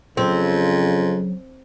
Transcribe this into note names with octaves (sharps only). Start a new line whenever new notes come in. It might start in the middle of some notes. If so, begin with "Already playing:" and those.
F2 C#3 F#3 C4